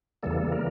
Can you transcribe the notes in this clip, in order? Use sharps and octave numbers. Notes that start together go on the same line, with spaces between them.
E2 C#3 E3 G3 A#3 A4
A#4